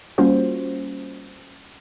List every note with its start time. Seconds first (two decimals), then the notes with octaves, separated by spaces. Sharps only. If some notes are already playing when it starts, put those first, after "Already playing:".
0.18 G3 A#3 C#4 F4 F#4 C5